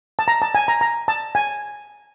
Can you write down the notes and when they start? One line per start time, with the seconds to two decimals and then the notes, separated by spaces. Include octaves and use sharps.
0.19 A5
0.28 A#5
0.42 A5
0.55 G#5
0.68 A#5
0.81 A#5
1.08 A5
1.35 G#5